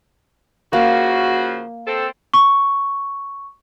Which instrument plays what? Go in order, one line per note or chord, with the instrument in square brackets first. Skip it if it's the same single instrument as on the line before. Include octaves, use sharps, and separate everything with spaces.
[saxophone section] C#3 F3 F#4 [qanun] A#3
[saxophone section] C4 A4
[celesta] C#6